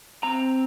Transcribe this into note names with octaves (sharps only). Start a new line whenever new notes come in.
C4 A#5